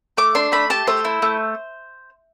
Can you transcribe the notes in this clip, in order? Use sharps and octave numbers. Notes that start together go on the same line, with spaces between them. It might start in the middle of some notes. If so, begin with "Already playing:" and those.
A3 D6
D4 C6
A3 B5
G4 A5
A3 C5
E4
A3